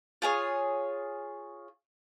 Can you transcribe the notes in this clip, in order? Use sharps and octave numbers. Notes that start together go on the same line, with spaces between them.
F4 G#4 C#5